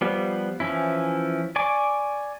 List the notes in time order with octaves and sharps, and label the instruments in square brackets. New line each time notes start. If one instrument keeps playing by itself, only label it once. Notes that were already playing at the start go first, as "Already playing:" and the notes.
[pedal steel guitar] F3 G3 B3
E3 F3 C#4 E4
D5 G#5 C#6 D6